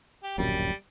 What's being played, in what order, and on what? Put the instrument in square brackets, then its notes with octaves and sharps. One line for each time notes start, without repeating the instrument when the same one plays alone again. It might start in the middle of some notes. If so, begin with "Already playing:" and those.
[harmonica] G4
[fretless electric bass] D1 A#1 F#2 [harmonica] G3